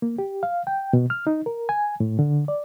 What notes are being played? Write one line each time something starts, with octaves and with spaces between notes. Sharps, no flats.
A#3
G4
F5
G5
B2
F6
D#4
A#4
G#5
A2
D3
D5